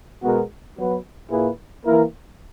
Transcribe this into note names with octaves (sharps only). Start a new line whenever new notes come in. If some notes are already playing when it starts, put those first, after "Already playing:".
B2 G#3 B3 F#4 A#4
F#3 B3 F#4 B4
A#2 A#3 E4 G#4 B4
E3 A#3 E4 A#4